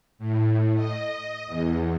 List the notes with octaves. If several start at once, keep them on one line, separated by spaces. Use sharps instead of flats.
A2
D#5
E2